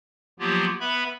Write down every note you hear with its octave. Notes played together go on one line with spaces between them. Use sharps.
F3 F#3 A#3 B3 F4 G4
B3 B4 E5 B5